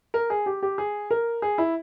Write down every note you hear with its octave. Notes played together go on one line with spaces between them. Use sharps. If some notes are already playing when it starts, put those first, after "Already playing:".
A#4
G#4
G4
G4
G#4
A#4
G#4
E4